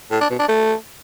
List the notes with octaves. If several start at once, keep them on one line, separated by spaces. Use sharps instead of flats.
A2
D4
B2
D4
A3